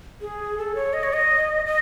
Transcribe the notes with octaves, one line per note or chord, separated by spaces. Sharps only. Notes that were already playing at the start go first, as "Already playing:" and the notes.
G#4
A4
C#5
D#5
C#5
D#5
D#5